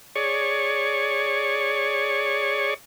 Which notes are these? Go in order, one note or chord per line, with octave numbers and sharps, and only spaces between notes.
G#4 C#5 D5 C#6